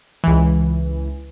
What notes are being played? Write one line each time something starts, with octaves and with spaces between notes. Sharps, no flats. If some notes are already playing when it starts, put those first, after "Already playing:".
C#2 E3